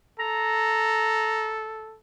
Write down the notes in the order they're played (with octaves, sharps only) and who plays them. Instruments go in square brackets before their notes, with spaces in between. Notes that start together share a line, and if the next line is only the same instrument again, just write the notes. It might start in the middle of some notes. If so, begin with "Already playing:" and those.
[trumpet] A4 [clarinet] A#5